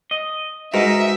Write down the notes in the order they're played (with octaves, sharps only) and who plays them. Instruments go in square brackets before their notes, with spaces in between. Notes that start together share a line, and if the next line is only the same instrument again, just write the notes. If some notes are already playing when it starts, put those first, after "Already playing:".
[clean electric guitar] D#5
[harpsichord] G#2 [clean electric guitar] D#4 A#4 [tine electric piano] F#4 B4 D#5 [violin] E5